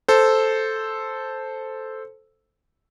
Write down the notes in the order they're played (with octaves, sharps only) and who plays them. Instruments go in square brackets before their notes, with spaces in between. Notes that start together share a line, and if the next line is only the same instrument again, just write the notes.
[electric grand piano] A4 C5